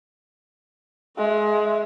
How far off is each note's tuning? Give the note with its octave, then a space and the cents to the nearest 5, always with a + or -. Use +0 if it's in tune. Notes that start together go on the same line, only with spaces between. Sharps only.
G#3 +20 E5 +0